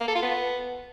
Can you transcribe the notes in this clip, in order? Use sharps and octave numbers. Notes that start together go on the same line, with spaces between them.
A#3
A4
F4
B3